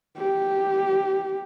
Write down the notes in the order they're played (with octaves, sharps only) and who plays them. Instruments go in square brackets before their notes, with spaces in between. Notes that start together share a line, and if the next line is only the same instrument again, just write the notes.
[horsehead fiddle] G4